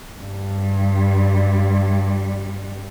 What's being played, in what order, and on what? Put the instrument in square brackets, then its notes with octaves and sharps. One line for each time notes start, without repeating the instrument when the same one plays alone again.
[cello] G2 G3